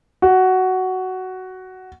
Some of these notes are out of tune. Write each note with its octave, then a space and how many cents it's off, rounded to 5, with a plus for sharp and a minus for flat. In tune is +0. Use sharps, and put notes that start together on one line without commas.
F#4 +10